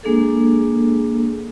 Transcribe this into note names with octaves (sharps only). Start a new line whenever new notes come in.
G#3 A#3 D4 G#4 A4